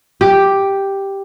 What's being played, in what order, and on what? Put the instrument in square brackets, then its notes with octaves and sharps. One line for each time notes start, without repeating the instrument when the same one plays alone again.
[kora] G4